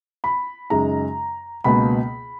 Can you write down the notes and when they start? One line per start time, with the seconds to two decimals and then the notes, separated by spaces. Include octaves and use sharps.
0.24 B5
0.70 F#2 C#3 G#3 D#4 A#5
1.64 C#2 B2 A#3 B5